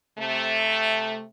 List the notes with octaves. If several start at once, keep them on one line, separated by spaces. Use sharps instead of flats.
C3 A3